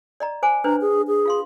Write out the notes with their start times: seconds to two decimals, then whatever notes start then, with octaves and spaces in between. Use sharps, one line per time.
0.20 D5 D#5 A#5
0.43 C5 G#5 D6
0.64 D4 B4 C5 A#5
0.81 G#4
1.08 G#4
1.26 F4 F5 C6